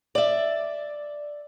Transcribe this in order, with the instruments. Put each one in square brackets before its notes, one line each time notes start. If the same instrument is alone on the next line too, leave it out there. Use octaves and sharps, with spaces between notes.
[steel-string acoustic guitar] D5 E5